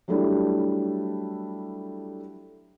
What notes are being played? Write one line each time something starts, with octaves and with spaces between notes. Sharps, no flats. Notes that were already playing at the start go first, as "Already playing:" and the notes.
F#3 G3 A3 D4 E4